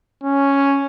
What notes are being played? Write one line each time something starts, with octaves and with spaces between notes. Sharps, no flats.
C#4